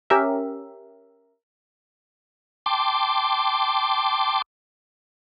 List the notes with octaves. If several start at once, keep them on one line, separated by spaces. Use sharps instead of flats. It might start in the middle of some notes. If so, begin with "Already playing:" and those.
C#4 G4 A#4 E5
G5 A5 C6 D6